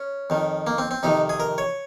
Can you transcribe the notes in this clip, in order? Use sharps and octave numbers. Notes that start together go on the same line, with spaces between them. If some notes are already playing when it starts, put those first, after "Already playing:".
Already playing: C#4
F2 D#3
A#3
C4
C4
F2 C3 D#3 D#4
G#4
A#4
C#5